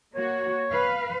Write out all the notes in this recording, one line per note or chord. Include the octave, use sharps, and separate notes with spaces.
A#3 F#4 C#5
B4 F5